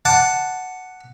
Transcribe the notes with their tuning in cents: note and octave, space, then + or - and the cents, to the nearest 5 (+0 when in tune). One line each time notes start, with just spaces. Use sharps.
F#5 +0 A5 +0 D6 +0